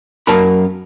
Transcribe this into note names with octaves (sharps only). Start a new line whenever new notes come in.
F#2 A#3 A#4 A5 B5